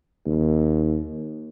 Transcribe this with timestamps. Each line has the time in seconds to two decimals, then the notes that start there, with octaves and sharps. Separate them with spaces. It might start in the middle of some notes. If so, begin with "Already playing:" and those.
0.26 D#2